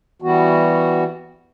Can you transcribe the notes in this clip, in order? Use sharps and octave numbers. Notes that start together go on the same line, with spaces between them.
E3 G3 B3 F#4